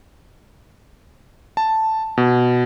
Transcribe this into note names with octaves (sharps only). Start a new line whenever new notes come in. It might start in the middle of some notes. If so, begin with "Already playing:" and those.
A5
B2